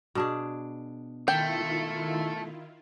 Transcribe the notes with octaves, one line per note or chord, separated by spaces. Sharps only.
B2 D4 G#4
D#3 A3 E4 F4 G5